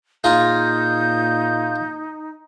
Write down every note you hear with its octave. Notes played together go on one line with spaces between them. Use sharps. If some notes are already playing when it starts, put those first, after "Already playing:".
A#2 D#4 F4 G#4 A#5 G6